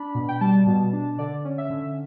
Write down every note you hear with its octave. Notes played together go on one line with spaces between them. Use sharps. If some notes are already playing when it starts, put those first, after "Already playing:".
Already playing: D4 B5
B2
G5
G3 A5
B2
D4
D3 D5
C#4
E5
D3